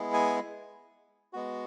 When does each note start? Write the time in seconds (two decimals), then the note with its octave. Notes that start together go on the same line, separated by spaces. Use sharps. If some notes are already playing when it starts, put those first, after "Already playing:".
Already playing: G#3 B3 E4 G#4
0.14 G#5
1.33 G#3 B3 F#4